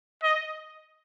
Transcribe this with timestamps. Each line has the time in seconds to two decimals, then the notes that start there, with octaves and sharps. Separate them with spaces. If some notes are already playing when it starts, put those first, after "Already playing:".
0.23 D#5